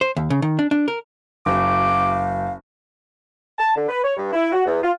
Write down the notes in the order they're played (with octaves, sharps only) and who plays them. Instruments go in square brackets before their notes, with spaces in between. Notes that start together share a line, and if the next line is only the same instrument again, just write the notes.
[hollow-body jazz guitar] C5
D#2
C#3
D#3
D4
D4
A#4
[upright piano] F#1 [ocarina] F5 [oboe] D6
[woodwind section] A5
D3
B4
C#5
G2
E4
F#4
E2
F4